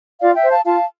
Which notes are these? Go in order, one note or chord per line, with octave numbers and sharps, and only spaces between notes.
F4 D5 F5
E5 G5
C5
F5 A5
F4 F5 A5